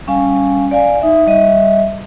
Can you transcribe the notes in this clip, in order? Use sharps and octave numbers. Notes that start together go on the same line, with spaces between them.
G3 C#4 F5 G#5
D5 F5 G#5
D#4 E5
G3 D#5 E5